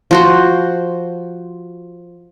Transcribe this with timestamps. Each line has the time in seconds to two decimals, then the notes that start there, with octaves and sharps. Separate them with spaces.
0.11 F3 F#4 C5